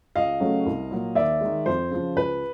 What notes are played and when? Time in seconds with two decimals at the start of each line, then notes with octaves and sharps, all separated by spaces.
0.16 C#2 D#5 F5
0.40 C#3 F#3 A3 C#4
0.66 C2
0.91 A#2 F#3 A#3
1.15 D#2 D5 E5
1.41 D#3 G#3
1.66 F2 C5
1.91 C#3 F3
2.16 C#2 B4